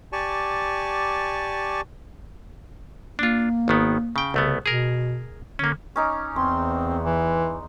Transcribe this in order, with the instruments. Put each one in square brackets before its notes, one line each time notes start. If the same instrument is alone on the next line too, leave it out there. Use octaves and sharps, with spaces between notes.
[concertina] G4 D5 G#5 A5 C#6
[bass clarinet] A#3 [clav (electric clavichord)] D4 F4
[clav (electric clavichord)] G#1 D#3 B3
C#3 G5
[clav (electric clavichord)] C2 A3 B3 [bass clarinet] C#3
[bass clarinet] B2 [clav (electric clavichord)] G#4 A#4
[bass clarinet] D3 [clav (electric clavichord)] A#3 C#4
[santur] C#4 D#4 D6
[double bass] E2 [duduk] C4 [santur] C6
[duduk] E3